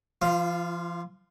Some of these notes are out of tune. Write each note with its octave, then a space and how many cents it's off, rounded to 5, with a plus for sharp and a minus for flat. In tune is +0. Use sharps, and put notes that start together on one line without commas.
F3 -40 F4 +0